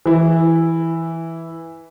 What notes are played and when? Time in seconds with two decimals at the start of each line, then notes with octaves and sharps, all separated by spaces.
0.06 E3 E4